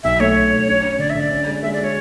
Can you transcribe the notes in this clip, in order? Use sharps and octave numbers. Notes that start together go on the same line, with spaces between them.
B1 E5
A3 C#5
B1
B1
C#4
C#4
D3 D5
E5
D3 D5
C#4
G#3
D5
G#3 E5
D5
G#3
C#5